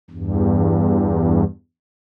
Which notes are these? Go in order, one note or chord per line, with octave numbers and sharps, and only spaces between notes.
E2 G2